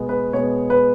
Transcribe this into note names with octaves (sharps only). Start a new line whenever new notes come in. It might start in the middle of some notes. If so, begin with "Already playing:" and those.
Already playing: B2 G#3 B3
B4
B2 G#3 B3 C#5
B4